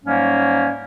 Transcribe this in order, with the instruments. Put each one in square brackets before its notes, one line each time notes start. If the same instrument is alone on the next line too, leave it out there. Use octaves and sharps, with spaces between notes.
[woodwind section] G#2 F#3 G3 A#3 C#4